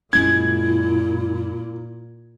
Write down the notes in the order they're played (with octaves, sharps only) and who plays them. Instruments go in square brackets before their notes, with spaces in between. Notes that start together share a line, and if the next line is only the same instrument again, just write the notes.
[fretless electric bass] F#2 G#3 C#4 [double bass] A#2 [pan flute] E4 [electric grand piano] G#6